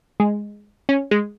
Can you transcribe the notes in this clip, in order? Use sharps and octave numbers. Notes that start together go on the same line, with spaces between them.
G#3
C#4
G#3